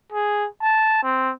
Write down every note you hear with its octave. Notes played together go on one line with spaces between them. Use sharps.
G#4
A5
C4